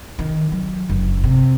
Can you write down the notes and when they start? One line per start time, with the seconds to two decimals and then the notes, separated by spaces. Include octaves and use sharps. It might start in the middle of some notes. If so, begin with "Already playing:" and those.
0.19 D#3
0.52 F#3
0.89 F#1
1.24 C3